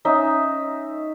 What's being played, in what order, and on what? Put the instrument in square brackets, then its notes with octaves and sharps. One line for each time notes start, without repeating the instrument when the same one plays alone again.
[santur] C#4 D#4 E5